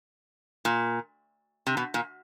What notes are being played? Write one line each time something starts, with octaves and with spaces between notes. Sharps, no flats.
A#2
C3
B2
A#2